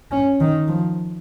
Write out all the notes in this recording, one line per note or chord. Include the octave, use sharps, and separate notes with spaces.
C#4
D#3
F3